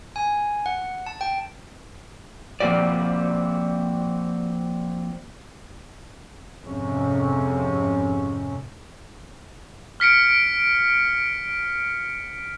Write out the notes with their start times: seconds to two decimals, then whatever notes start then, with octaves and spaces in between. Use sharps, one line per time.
0.16 G#5
0.66 F#5
1.06 A5
1.21 G5
2.60 F3 A#3 C4 F#4 D5
6.64 F2 G#2 C3 C#4
10.00 F6 B6 C#7 D7